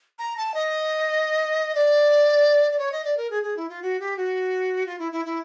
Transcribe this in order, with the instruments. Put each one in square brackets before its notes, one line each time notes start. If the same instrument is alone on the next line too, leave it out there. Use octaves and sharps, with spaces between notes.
[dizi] A#5
A5
D#5
D5
D5
C#5
D#5
D5
A#4
G#4
G#4
E4
F4
F#4
G4
F#4
F4
E4
E4
E4